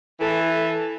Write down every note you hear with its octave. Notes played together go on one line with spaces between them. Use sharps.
E3 A4